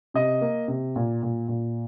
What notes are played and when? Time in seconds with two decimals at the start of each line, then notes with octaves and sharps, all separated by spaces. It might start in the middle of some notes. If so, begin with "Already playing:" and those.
0.14 C3 D#5
0.41 A#3
0.68 C3
0.96 A#2
1.23 A#2
1.48 A#2